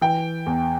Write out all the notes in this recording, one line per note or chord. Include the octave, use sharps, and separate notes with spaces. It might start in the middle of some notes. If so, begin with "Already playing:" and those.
E3 G5
E2